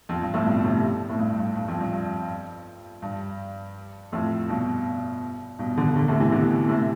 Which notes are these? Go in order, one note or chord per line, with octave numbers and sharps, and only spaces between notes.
F2
G2
F2 A2
G2 B2
A2 C3
A2
G2
G2
G2
F2
G2
G2
G2
F2 A2
G2 B2
G2 B2
B2 D3
B2 D3
A2 C3
C3 E3
B2 D3
A2 C3